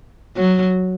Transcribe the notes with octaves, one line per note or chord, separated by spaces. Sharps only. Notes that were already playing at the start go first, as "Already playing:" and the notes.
F#3